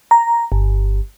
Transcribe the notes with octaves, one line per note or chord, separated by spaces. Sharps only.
A#5
G1